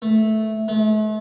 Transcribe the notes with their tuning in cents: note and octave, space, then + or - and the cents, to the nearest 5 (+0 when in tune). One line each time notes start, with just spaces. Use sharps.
A3 -10
A3 -40